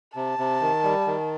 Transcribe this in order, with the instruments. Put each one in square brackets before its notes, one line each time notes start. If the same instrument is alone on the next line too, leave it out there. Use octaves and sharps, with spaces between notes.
[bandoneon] C3 [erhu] A5
[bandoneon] C3
D#3
G3
D#3